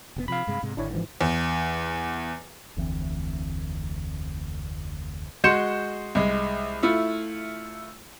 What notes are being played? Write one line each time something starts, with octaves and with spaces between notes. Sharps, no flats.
F1 B2 B3
C3 F3 F5 B5
G2 C3 G#3
G#2 C3 G#3
G#1 D3 D4 E4 C#5
G#2 E3 F3
E2
F1 D2 E3 C4
G#3 F#4 C6 G6 C#7 E7
C2 G#3
A3 E4 F4